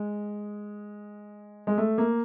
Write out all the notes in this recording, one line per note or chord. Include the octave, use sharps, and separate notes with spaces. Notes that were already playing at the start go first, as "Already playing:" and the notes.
Already playing: G#3
G#3
A3
A#3